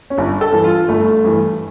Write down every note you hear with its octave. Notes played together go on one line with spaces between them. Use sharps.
C#4
G1 D4
A4
G2 E3
F4
G1 A3
G2 E3